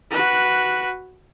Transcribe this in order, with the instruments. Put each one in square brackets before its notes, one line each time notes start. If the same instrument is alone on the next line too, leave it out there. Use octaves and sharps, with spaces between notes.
[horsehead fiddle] F#4 B4